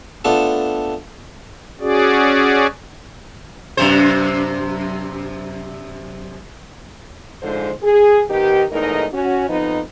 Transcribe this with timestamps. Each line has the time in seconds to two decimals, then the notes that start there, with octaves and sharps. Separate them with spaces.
0.25 A3 B3 D4 F4 A4
1.80 C#4 F#4 G#4 D5
3.77 F#2 C3 C5
7.43 G#2 D3 F3 G#3 C5
7.83 G#4
8.30 D#3 B3 D#4 G4
8.71 E2 G#2 A3 D#4 A#4 D#5
9.13 C#4 F#4
9.49 F2 F3 B3 D#4